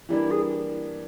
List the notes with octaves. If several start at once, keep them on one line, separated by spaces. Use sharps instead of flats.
E3 G3 A#3 D4 E4
G#4